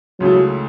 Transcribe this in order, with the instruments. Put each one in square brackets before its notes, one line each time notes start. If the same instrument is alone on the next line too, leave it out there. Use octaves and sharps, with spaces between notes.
[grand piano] C#2 C#3 E3 A3 [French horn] F#3